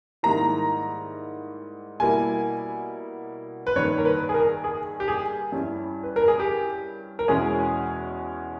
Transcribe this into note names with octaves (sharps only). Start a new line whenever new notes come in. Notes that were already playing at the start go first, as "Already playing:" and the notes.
G#2 D#3 G3 A#3 E4 A#5
B2 G3 A#3 E4 G#5
B4
G2 D#3 A#3 C#5
A#4
B4
G#4
A#4
G#4
G4
G#4
G2 G3 C#4 E4
B4
A#4
G#4
G4
A#4
E2 B2 G#3 C#4 E4 G#4